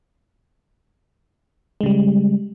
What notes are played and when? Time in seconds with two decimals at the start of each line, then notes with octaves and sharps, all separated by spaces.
1.81 G#3
1.83 C#3
1.86 G3